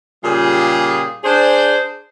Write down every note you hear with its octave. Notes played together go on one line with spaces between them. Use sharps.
A#2 C#3 G3 F4 G4 G#4
D4 G#4 C5